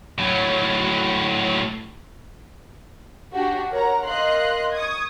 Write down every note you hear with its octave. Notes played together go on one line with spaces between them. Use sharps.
A2 F#3
D4 F#4 G4
A#4 C#5 F#5 A#5
A#4 D#5 F5 C6 F#6
C#6 D#6 G#6